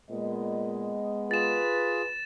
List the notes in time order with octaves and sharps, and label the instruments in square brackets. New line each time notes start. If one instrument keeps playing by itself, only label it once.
[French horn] A#2 [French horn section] G#3 B3 D#5
[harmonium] F4 G#4 [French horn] B4 [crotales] A6 E7